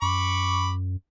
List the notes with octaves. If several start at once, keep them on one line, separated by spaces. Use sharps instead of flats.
F#2 B5 C#6 D6